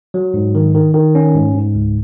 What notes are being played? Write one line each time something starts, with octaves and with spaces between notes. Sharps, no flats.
F#3
G#2
D#3
D#3
D#3
C#4
G#2
G#2
C#2